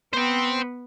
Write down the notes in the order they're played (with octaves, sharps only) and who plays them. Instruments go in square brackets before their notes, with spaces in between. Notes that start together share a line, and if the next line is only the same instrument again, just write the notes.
[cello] B3 [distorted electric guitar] C5 G5